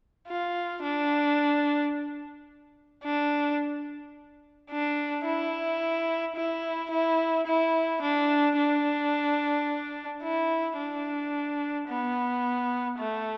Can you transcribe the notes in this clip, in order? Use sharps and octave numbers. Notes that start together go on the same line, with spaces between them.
F4
D4
D4
D4
E4
E4
E4
E4
D4
D4
E4
D4
B3
A3